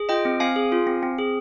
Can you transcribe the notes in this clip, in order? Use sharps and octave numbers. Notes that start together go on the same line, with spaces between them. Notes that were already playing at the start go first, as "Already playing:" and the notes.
Already playing: G#4
F4 D#5 G5
C4
C4 F5 G#5
G#4
F4
C4
C4
G#4